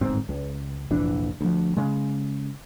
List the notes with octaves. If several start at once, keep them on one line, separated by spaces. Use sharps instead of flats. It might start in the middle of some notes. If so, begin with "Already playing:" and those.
D1 G1 G#2 C4
C#2
F1 A#1 E3 D4
D2 F3
C#3 G#3